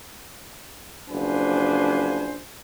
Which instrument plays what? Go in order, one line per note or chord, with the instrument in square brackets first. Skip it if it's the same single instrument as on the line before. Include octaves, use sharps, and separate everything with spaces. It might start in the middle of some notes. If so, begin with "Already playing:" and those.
[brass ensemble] F#1 F3 D4 B4 C5 G#5